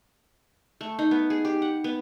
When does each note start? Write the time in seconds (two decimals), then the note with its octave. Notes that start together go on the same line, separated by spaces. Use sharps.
0.81 A3
0.99 D#4
1.11 B3
1.30 G#4
1.45 G4
1.62 F#5
1.84 B3